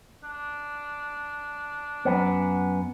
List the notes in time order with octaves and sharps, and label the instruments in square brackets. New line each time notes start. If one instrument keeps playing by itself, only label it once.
[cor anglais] D4
[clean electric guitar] F#2 B3